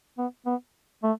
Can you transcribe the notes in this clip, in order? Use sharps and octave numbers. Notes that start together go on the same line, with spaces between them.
B3
B3
A3